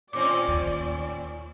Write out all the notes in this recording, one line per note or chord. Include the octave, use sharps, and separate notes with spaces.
A2 C4 C#4 D5 D6
D#2